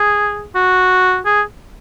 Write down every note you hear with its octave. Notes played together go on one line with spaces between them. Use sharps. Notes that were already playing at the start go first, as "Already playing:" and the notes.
Already playing: G#4
F#4
G#4